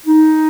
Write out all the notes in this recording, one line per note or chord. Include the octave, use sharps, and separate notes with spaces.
D#4